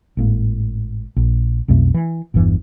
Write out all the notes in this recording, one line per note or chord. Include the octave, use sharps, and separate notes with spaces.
G#1 A2 A#3
A#1
B1 F2 B2 A3
E3
G1 E2 G2 E3